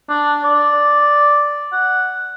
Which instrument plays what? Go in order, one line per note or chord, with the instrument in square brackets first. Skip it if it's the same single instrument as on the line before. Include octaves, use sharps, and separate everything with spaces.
[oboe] D4
D5
F#5